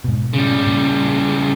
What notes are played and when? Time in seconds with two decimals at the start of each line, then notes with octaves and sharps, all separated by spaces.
0.04 G#2 B2
0.34 C#3 G3
0.67 A#2